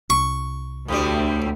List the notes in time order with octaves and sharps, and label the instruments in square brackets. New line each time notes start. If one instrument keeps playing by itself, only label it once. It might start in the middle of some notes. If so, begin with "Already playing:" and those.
[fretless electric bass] C2 [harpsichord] C#6
[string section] D2 [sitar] A2 C3 G3